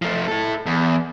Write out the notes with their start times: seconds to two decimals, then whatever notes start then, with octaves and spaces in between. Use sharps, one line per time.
0.02 F3 A3
0.28 E4 A4
0.66 E2